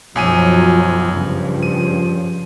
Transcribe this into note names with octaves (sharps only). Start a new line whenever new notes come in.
B1 F#2 F3 F#3 G#5 D#7
G2 C#3 F3
D#7